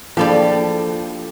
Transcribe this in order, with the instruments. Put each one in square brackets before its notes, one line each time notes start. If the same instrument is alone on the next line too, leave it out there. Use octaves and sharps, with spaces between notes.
[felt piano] F3 [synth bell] A#3 D4 [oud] G4 A4 D5